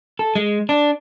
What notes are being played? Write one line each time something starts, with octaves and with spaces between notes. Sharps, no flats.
A4
G#3
D4